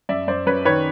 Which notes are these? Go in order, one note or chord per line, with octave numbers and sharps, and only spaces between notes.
F#2 D5 E5
F#2 C5 D5
F#2 B4 C#5
D#3 B4 C#5